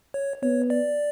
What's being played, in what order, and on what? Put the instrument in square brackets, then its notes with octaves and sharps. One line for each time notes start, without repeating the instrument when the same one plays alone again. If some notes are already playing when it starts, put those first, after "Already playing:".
[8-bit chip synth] C#5
[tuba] B3 [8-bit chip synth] C#5
[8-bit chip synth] D5